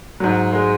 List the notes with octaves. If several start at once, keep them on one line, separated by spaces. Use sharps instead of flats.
G#2 F#3
G#3